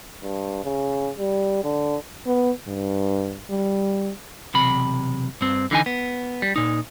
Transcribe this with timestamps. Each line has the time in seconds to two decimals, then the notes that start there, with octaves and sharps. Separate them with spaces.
0.23 G2
0.64 C#3
1.19 G3
1.64 D3
2.27 B3
2.67 G2
3.50 G3
4.54 B1 E2 C3 B5
5.41 G2 C4
5.71 D3 E3 D#4 G#5
5.86 B3
6.42 G3
6.56 A#2 D#4